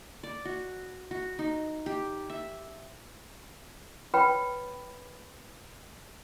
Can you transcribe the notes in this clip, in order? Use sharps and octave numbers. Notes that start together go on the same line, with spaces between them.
D5
F#4
F#4
D#4
G4
E5
B4 C#5 G5 B5